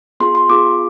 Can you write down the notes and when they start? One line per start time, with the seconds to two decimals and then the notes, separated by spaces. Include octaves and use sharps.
0.20 B3 F4 G#4 C6
0.35 C6
0.49 B3 F4 G#4 D6